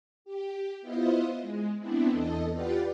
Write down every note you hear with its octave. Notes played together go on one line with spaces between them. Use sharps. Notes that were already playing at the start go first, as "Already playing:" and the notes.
G4
B3 E4 F4 C5 D#5
G#3
B3 C4 D4 E4
E2 A4 D#5
F4 G4 B4 D5 F#5